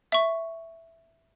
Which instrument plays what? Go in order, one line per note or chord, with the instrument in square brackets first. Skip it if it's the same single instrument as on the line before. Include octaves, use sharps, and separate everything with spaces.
[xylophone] E5 C#6